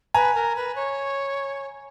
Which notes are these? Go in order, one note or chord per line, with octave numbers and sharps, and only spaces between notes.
B4 G#5 A#5
A#4
B4
C#5